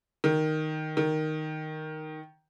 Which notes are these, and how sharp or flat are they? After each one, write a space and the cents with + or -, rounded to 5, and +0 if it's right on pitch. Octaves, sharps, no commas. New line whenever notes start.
D#3 +0
D#3 +0